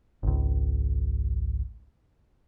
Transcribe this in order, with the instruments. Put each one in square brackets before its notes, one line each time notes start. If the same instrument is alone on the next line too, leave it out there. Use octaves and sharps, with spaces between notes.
[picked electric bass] G#1 C#2